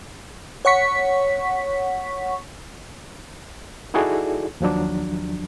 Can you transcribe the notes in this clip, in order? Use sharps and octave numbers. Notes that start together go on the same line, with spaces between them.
C#5 F#5 C#6 B6
D#4 E4 F#4 G#4 A4 D5
D#2 F3 F#3 D4